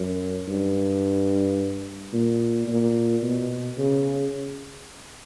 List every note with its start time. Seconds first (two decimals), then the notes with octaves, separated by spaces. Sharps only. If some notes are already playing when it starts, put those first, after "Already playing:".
Already playing: F#2
0.48 G2
2.13 A#2
2.67 A#2
3.22 B2
3.78 C#3